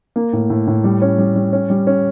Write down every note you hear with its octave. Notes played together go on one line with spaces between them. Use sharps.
A#3
A2
A2
A2
G3
C#4
G3
G3
C#4
G3
C#4